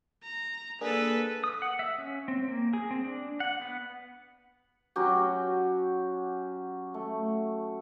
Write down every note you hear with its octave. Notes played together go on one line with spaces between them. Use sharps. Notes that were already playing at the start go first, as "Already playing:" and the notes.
A#5
A#3 D4 G#4 A4 B4
D#6
F#5
E5
C#4
C4
A#3
G#4
C4
D4
F#5
B3
F#3 C#4 F#4 G4
A3